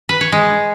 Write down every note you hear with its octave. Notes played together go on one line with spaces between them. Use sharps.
B4
C#5
G#3